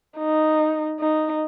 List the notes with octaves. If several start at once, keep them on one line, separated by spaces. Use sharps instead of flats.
D#4
D#4